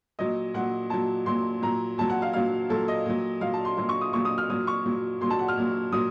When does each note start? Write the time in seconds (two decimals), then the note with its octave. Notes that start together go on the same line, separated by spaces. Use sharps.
0.19 A#2 F#3 D#5
0.54 A#2 F#3 F#5
0.90 A#2 F#3 A5
1.26 A#2 F#3 C6
1.62 A#2 F#3 A#5
1.98 A#2 F#3 A5
2.10 F#5
2.22 F5
2.33 A#2 F#3 F5
2.69 A#2 F#3 A4
2.88 D#5
3.06 A#2 F#3
3.41 A#2 F#3 F5
3.54 A5
3.65 C6
3.77 A#2 F#3 C6
3.89 C#6
4.01 D#6
4.13 A#2 F#3 C#6
4.25 D#6
4.38 F6
4.50 A#2 F#3 D#6
4.67 C#6
4.86 A#2 F#3
5.21 A#2 F#3 C6
5.30 A5
5.39 F#5
5.48 F6
5.57 A#2 F#3
5.92 A#2 F#3 D#6